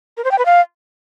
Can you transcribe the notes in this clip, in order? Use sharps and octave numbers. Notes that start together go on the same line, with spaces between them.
A#4
C5
G5
B4
F5